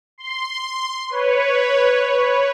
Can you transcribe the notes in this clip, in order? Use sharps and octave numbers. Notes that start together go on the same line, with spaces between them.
C6
B4 C#5